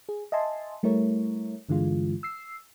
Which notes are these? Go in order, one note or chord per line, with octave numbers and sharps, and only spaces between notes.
G#4
D#5 E5 G#5 A5 C6
G3 A3 E4 A#4 C#5
G2 D3 E3 G#3 F4
E6 C7